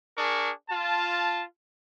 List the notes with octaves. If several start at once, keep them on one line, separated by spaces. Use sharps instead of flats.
D4 G#4 A#4 C#6
F4 A5